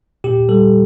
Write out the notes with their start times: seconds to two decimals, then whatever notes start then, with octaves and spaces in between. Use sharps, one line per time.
0.24 A#2 G4
0.49 G3 A4